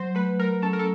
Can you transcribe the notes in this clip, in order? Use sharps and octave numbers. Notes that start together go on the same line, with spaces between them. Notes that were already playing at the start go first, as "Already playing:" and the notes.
Already playing: F#3 C5
A3 B4
A3 A#4
C#4 A4
A#4
A4